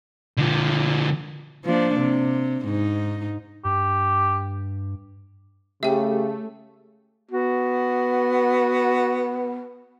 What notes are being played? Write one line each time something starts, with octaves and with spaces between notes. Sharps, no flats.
D3 F3
F3 A#3 D4
C3
G#2 D#4
G2 G4
C#3 A3 G4 E5 G5
B3 F#4